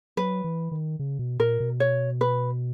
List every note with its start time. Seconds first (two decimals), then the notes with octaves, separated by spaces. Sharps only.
0.17 F#3 B4
0.44 E3
0.71 D#3
0.99 C#3
1.19 B2
1.39 A#2 A#4
1.60 B2
1.80 C#5
2.21 B4